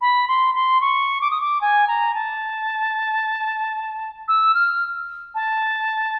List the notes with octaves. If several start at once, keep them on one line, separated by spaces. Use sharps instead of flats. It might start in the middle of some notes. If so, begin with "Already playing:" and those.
B5
C6
C6
C#6
D6
D#6
D6
G#5
A#5
A5
E6
F6
A5